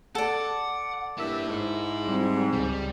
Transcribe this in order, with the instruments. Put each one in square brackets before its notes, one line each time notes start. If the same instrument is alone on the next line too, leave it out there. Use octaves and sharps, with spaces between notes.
[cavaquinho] A4 D5 [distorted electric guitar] F#5
[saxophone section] G2 A#3 E5 [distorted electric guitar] E4 A5
[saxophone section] G#2
[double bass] G3 C4
[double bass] C#2 [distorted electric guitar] G3